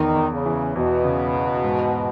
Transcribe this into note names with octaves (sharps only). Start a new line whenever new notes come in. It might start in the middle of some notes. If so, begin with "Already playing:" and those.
Already playing: E2 D#3
E2
C#3
E3
E2 B2
C#3
E2
G#2